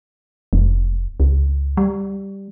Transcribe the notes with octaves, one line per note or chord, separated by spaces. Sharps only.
F1
C#2
G3